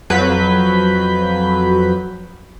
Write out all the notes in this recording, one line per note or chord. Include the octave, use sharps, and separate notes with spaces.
F2 F#3 B4 G6 B6